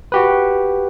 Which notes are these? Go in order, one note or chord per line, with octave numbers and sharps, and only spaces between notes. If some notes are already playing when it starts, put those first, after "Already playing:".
F#4 G4 B4